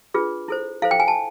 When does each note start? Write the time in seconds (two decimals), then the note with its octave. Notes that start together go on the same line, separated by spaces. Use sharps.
0.14 D4 F4 G#4 B4
0.48 E4 A4 C5
0.82 E4 A4 C5 F5
0.91 G5
1.00 G#5
1.08 A5